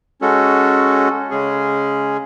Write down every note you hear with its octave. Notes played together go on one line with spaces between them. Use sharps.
G#3 C#4 F#4 A4
C#3 G#3 C#4 G#4